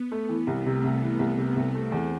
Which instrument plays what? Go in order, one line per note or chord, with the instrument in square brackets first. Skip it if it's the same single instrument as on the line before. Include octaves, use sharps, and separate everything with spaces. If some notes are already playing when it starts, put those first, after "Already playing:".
Already playing: [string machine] B3
[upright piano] A3
[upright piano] E3 [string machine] B3
[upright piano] C2
[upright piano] C3 [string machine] A3
[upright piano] C2
[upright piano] E3 [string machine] B3
[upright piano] C2
C3
C2
[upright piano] A3 [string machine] C4
[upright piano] E2